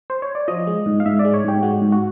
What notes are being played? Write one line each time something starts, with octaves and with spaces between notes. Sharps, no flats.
C5
C#5
D5
F3 D#5
G#3
G#2
F5
G#2 E5
D5
G#3
C#5
G#2 G4
G#3 F#4
G#2
F#4